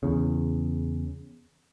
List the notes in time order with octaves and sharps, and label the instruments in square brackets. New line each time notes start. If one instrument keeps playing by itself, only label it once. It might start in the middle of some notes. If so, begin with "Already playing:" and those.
[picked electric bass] E2 C#3